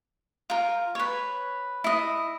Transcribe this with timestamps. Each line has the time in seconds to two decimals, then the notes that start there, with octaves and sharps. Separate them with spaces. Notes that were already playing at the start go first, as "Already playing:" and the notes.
0.50 F4 A#4
0.95 B4 C#5
1.84 E4 D#5